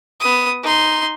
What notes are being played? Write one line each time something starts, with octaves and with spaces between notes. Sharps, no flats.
B3 D#6
D#4 C6